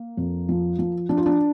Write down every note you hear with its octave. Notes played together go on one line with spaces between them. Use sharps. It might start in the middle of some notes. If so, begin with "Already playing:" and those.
Already playing: A#3
F2
F3
F3
F3 D4
F4
D4